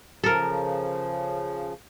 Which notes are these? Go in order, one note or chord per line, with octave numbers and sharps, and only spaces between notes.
C#3 F3 A4 A#4